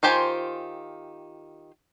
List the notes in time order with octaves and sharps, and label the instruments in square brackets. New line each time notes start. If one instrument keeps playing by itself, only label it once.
[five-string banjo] D#3 F4 G4 C5 G#5